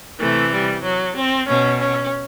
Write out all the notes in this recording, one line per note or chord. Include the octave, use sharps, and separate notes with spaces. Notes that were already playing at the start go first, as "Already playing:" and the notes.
C3 E3 A3
G3
F#3
C4
B2 C#4
C#4